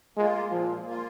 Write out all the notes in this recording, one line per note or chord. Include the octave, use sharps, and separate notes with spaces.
G#3 A#3 F4
A#2 F3
A#3
F4